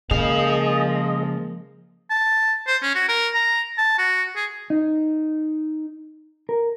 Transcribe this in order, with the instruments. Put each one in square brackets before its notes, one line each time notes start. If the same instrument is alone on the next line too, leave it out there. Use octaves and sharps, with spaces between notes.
[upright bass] C#3 [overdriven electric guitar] F3 F5 [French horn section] G#3 A#3 [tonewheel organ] G#4 D#5
[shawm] A5
C5
C#4
F#4
A#4
A#5
A5
F#4
G#4
[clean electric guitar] D#4
A#4